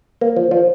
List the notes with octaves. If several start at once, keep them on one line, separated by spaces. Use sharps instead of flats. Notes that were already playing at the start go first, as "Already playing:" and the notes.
A#3
F3
F3